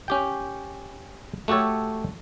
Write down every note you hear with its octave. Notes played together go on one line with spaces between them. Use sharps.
C#4 G4 G5
A3 F#4 G4 A4 C#5